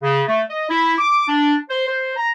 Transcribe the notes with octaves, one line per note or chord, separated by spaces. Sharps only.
C#3
A3
D#5
E4
D6
D4
C5
C5
A#5